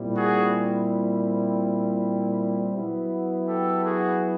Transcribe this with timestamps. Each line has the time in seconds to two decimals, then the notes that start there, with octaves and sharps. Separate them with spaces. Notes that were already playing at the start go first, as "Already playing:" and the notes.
Already playing: A#2 G3 C4 E4
0.16 F#4 G#4
2.74 F#3 B3 E4
3.48 G4 A4
3.85 F#4 G#4